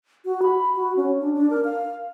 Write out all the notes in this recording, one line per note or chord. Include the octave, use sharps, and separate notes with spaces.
F#4
B5
F#4
C#4
D4
D4
A#4
F5